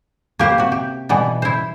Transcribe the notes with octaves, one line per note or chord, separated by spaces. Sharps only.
A#3 G4 B4 C5
C3 F#4
G4
B2 E3 G3 B3
E4 C5